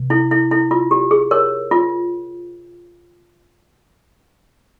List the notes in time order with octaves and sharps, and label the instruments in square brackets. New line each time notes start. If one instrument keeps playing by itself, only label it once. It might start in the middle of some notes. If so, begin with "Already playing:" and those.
Already playing: [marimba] C3
[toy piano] E4
E4
E4
F4
G4
G#4
A#4 C#5
F4